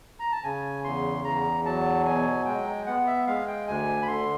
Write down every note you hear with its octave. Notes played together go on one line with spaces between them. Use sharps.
A#5
A5
C#3 G#5
E2 C6
E2 A#5
F#3 A5
B2 G#5
G#3 G5
B3 F#5
E5
G#3 F5
G5
D2 G#5
B5
D3 C6